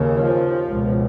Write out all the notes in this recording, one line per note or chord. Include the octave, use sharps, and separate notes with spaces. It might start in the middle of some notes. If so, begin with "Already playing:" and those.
Already playing: D#2 C#3
F3
C#2 B2